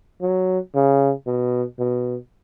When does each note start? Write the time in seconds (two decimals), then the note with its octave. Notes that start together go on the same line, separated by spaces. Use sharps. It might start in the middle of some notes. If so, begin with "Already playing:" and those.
0.22 F#3
0.75 C#3
1.27 B2
1.79 B2